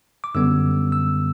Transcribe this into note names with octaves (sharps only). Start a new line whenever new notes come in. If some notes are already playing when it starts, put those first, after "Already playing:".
D6
F#2 D3 G3 B3 E6
E6